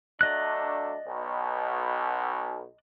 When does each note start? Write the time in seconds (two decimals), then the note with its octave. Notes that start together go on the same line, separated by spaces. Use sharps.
0.21 F#3 A3 D4 D5 D#5 F#6
1.07 B1 B2